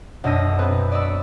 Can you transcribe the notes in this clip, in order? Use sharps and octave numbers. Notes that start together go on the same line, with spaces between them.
B1 F#2 D4 E6 A#6 D#7
B3 C4 B4
D5 D#5 B5 C#6 E6